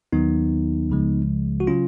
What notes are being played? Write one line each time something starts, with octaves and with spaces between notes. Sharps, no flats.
D#2 D#3 F#3 B3 D#4
C#2 C#3 F3 G#3
F#4
C#3 F#3 C#4 F4